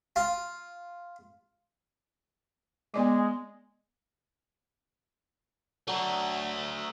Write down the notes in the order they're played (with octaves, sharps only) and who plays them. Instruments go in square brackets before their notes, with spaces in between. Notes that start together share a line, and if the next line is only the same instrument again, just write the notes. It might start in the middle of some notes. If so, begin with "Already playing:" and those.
[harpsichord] F4
[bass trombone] G#3 [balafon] B3 D5 D6
[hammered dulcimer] F#3 [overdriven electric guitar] A3 D4